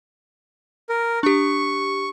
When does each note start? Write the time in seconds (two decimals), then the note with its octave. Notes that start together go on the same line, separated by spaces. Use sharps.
0.89 A#4
1.23 D4 G4 C#6